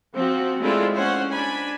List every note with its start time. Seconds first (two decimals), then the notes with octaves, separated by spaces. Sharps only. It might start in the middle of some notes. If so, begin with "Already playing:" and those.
0.14 F3 C4 F#4
0.60 G#3 A3 C4 D4 E4 F4
0.95 C#4 C5 C#5 F#5
1.31 D4 G#5 B5